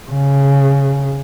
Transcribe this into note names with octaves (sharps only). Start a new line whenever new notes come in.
C#3